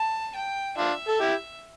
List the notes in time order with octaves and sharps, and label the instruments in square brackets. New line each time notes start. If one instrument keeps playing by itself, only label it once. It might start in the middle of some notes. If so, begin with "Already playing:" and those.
Already playing: [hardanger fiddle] A5
G5
[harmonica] D4 F4 [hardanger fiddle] E5
[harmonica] A4
E4 G4